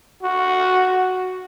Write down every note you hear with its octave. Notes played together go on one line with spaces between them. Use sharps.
F#4